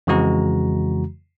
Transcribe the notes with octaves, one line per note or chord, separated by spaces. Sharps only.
F2 C#3 E3 G#3 F#4 A#5